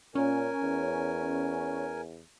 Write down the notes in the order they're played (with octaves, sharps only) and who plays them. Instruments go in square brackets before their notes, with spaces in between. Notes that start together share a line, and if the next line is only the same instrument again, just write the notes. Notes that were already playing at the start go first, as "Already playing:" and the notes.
[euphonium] A#2 [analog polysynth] C#4 [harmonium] A#4 G#5
[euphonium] E2